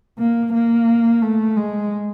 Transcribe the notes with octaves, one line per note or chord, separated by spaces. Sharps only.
A#3
A#3
A3
G#3